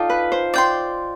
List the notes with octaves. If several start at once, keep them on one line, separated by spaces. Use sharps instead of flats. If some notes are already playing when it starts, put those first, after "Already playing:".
Already playing: D#4 F4 A4 D5 G5
B4
C5
D5 G5 C6